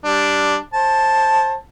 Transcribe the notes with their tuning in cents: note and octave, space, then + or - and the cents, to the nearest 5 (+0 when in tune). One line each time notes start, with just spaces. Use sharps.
G3 +0 D4 +0
C5 +25 A5 +0